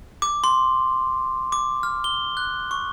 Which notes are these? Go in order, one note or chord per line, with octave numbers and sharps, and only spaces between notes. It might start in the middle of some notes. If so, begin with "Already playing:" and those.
D6
C6
D6
F6
G7
F#6
C#6